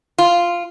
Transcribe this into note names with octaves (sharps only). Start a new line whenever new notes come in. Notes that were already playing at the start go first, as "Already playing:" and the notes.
F4